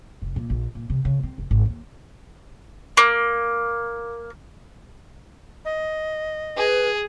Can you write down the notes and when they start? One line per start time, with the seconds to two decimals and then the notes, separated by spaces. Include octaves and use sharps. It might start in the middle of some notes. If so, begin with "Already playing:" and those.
0.22 F1
0.36 A#2
0.50 A#1
0.75 A#2
0.90 C3
1.05 C#3
1.23 C4
1.38 F1
1.51 G#1
1.65 D#2
2.97 A#3
5.65 D#5
6.57 G#4 B4